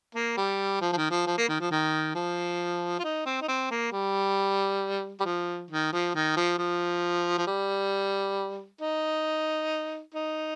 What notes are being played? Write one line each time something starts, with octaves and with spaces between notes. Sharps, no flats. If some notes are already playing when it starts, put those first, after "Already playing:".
A#3
G3
F3
F3
D#3
F3
F3
A#3
D#3
F3
D#3
F3
F4
D#4
C4
D#4
C4
A#3
G3
G3
F3
D#3
F3
D#3
F3
F3
F3
G3
D#4
D#4